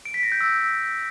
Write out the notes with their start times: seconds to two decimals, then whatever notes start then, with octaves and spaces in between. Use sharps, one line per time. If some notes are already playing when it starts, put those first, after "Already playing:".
0.05 D7
0.14 B6
0.23 A#6
0.32 G6
0.41 E6